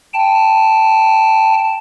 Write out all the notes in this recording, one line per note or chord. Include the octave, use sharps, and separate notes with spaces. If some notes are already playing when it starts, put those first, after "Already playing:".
G5 A5